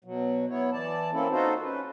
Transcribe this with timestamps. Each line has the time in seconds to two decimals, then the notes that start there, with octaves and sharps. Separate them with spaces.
0.04 B2 F#3
0.49 B3 E4 C#5
0.73 E3 D5 A5
1.13 A#3 C4 C#4 E4 A4
1.31 D#4 F4 F#4 A4 C5
1.62 C#4 B4